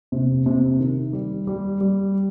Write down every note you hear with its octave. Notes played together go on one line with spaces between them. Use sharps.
C3
C3
D#3
G3
G3
G3